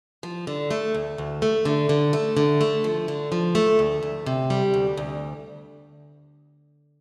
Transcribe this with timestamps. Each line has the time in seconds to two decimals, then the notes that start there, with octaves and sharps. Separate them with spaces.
0.23 F3
0.47 D3
0.71 A3
0.94 D2
1.18 D2
1.42 A3
1.65 D3
1.89 D3
2.13 A3
2.37 D3
2.61 A3
2.84 F3
3.08 D3
3.32 F3
3.55 A3
3.79 D2
4.03 D2
4.26 C3
4.50 G3
4.74 D2
4.97 D2